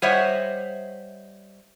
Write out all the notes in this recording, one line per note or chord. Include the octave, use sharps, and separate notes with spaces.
G3 C5 C#5 D#5 E5 F#5